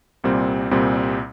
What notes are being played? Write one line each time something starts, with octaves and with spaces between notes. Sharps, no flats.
C2 A#2 G3 C4
C2 A#2 G3 C4